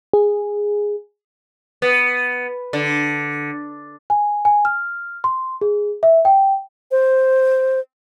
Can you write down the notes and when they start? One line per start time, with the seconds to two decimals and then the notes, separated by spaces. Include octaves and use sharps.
0.14 G#4
1.82 B3
2.73 D3
4.10 G#5
4.45 G#5
4.65 F6
5.24 C6
5.61 G#4
6.03 E5
6.25 G5
6.91 C5